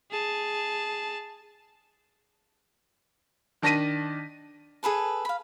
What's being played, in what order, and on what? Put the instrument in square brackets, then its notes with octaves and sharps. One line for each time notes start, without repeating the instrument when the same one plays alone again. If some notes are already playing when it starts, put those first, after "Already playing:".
[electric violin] G#4 A5
[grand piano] D#3 D4 A5 A#6 B6 D#7
[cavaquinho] G#4 A4 B4 A5
F5 B5